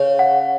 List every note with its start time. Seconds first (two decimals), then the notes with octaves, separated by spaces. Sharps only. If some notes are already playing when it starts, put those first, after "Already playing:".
Already playing: C#3 C#5
0.19 F#5